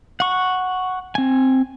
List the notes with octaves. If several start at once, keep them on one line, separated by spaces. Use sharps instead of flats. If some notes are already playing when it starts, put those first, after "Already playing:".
F#5 C#6
C4 G#5